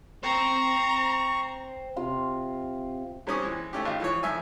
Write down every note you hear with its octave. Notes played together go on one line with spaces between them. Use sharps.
C5 G5 A#5 C#6
C3 F4 F5
A#2 G3 C4 C#4 C#6 D#6
E3 G#3
A3 C#4 G4
G#1 F4
E3 F3 C#5
F2 F3 E5 G#5